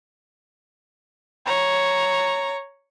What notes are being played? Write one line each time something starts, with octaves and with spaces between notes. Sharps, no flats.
C#5 A#5